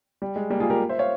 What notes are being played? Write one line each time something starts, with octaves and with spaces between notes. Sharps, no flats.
G3
G#3
G3 A#3
F4 G#4
G4 A#4
C5 E5
C#5 F5